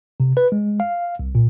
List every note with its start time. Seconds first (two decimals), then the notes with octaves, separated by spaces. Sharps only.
0.20 C3
0.37 B4
0.52 G#3
0.80 F5
1.19 C2
1.35 A#2